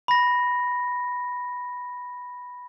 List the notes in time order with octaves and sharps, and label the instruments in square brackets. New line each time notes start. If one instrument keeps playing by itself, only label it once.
[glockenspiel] B5 A#6